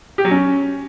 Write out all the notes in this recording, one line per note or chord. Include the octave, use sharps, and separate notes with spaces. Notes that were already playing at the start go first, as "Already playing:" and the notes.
G4
F#3
C#4